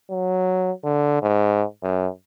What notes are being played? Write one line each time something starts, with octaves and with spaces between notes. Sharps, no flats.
F#3
D3
G#2
F#2